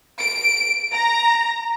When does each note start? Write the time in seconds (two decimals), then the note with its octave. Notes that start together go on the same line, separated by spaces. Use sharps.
0.20 D7
0.91 A#5